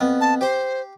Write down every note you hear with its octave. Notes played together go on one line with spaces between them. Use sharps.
F2 B3
A5
G4 C5 C6